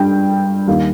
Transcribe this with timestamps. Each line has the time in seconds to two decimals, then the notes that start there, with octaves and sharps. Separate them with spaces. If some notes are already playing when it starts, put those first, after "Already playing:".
Already playing: G2 G3 G5
0.67 D#2 D#3 G3 F5